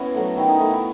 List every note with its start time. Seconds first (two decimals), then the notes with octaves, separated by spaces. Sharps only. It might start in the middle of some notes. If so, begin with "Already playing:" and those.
Already playing: B3 C#4 E4 F#4
0.14 F#3 A3
0.37 D#3 E4
0.48 D#4
0.59 A3 E4
0.71 E4